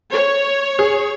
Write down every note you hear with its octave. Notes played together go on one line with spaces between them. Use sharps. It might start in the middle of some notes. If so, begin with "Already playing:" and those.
C#5
G#4